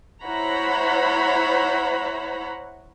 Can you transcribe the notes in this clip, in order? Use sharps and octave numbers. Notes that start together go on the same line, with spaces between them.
E4 C5 C#5 F#5 A#5 B5